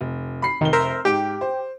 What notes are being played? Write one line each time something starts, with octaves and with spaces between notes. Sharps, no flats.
F1
B5 C7
F1 D#3 G7
A#4 C5 E5
G#2 G4 G5 D7
C5